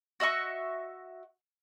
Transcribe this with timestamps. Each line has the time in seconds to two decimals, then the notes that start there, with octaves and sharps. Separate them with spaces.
0.20 F#4 D#5 E5 C#6